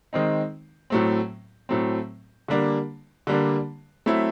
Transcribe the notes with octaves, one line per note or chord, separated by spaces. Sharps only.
D#3 G#3 C4 D#4
A2 F#3 A3 C4
A2 F#3 A3 C4
D3 G3 A#3 D4
D3 G3 A#3 D4
F#3 A3 C4 E4